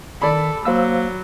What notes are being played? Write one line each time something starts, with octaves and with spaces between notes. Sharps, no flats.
D#3 A4 D5 B5
F#3 A#3 C5 F5 E6